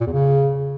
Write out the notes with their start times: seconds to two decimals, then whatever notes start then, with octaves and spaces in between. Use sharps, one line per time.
0.01 A#2
0.07 E2
0.13 C#3